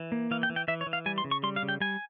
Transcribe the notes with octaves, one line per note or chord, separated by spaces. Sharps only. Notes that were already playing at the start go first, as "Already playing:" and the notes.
Already playing: E3
A#3
E3 F5
G5
E3
G5
E3 E5
C#5
E3
F5
G3 G#5
C6
C#3
C#6
G3 C6
F5
C#3
G5
G3 G#5